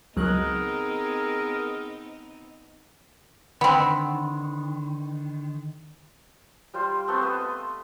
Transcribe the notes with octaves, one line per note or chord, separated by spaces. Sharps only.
C#2 F#3 B3 C4 D#4 G#4 A#4 F#6
D3 D#3 B3 C4 B5 C6
G3 F4 C5
A3 B3 C4 A4
B3 F4 C5 D#5
C6